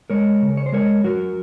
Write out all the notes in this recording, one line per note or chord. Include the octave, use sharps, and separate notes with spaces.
G#3 A#4 C#5
C#3
C#5
C5
G#3 A#4 C#5
F#3 F#4 A#4